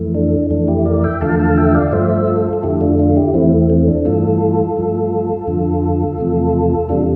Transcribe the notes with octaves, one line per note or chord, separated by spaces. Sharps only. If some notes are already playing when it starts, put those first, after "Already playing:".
Already playing: F2 E3 A3
D4
F2 E3 A3 D4
E4 G4
A#4 D5
E5 G5
E2 D3 F3 A3 F5 A5
F5 A5
E5 G5
D5 F5
G2 F3 A3 C5 E5
F4 A4
A4
F2 D3 A3 E4 G4
D4 F4
D4 F4
E4 G4
E2 E3 A3 C4 E4
C4
D4
G2 E3 A3 F4 A4
G2 F3 A3
F2 D3 F3
E2 C3 F3 A3
E2 C3 G3 D4 F4